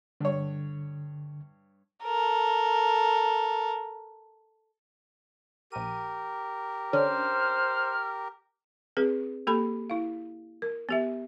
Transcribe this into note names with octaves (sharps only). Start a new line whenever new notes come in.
G2 D3 C#5
A4 A#4
A#1 G4 A#4 D#7
D3 C#4 D4 C5 F6
C4 G#4 B4
A#3 G4 A4 B5
E4 F5
A#4
B3 G4 E5